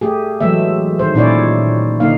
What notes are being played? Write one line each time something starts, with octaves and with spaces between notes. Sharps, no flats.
A3 G4 G#4
E3 F#3 G#3 A3 E5
D#3 C5
A#2 C#4 D#4 E4 C#5 D5
D3 A#3 D#4 F5